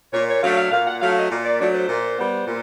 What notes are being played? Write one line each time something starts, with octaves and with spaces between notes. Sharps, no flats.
A#2 C#5
C#5
F#3 A3 D4 F5
F5
A#2 F5
F#5
F#3 A3 D4 F5
D#5
A#2
D5
F#3 A3 D4 D5
C5
A#2
G3 B3
A#2